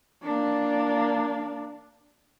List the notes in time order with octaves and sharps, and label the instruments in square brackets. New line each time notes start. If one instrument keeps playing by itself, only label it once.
[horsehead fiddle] A#3 D4